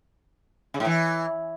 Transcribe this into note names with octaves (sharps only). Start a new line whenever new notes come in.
C#3
A2
E3